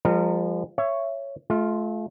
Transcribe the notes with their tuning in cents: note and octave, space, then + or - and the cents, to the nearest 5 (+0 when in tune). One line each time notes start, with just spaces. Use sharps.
F3 +0 G#3 -45 A#4 -25
C#5 +0 E5 +25
A3 -35 F4 +0